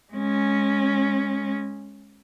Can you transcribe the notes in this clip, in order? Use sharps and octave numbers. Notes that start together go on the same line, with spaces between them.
G#3 C#4